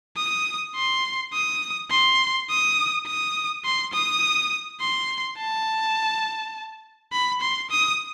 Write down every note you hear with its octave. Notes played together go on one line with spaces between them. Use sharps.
D#6
C6
D#6
C6
D#6
D#6
C6
D#6
C6
A5
B5
C6
D#6